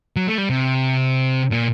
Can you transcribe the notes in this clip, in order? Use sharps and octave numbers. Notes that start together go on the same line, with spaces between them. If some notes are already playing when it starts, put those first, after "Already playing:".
F#3
A3
G3
C3
A#2